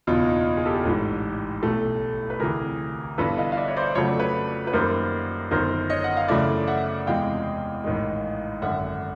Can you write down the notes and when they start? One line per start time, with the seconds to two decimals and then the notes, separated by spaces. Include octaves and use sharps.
0.07 F#1 E2 B2 D#4 F4
0.26 D#4
0.57 G#4
0.66 G4 A4
0.85 A1 G#2 E3
1.63 B1 A2 E3 A3
2.30 B4
2.40 D2 C3 E3 G#4 A#4
3.18 G1 G2 E3 A4 B4
3.38 D#5 F5
3.52 F5
3.57 D5 E5
3.68 C#5
3.77 C5 D5
3.95 F2 C#3 F#3 A3 C#5
4.08 D5
4.19 B4 C#5
4.67 B4
4.73 F#2 D#3 G3 A#3 A#4 C5
5.51 G1 F#2 D#3 A#4 C5
5.90 C#5 D#5
6.04 F#5
6.17 F5
6.28 F#2 C#3 E3 A3 D5 E5
6.67 E5 F#5
7.07 E2 C3 E3 G#3 F5 G5
7.84 A1 G#2 D#3 G#3
8.62 G#1 F#2 D3 E5 F#5